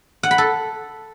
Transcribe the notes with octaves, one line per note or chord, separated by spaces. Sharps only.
F#5
B5
A4